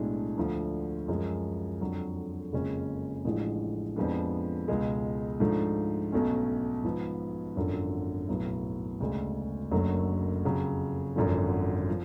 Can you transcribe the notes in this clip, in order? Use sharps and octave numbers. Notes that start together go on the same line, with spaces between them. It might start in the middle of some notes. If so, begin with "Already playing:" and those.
Already playing: B1 A2 G#3 D4
D2 D3 F3
F#2 F3 G#3
F2 D3 F#3
F#1 F2 C#3 G#3 C#4
A1 A2 F3 G#3 D4
F2 F3 G#3 B3 D4
C#2 B2 G#3
G#2 F3 A3 D4
B1 B2 A3 C#4
G#2 F3 B3
G#1 F#2 D3 F3
B1 A2 F#3 B3
D2 C#3 G#3
F#1 F#2 D3 F#3 A3
F2 C#3 F#3
G#1 F#2 D3 F3
F3